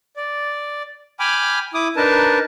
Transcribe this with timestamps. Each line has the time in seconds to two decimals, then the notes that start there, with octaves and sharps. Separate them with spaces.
0.17 D5
1.20 G5 G#5 B5 D6 F6
1.74 E4 D6 D#6
1.96 D4 D#4 A#4 B4 A5